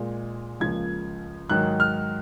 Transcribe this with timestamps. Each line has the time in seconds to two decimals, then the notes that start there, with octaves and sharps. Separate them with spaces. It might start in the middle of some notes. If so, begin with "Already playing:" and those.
Already playing: A#2 G#3
0.60 C#2 C#3 F3 A#3 G#6
1.50 G#2 D#3 F#3 F#6
1.80 F6